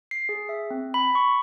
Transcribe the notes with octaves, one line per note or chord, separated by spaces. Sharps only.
C7
G#4
E5
C4
B5
C#6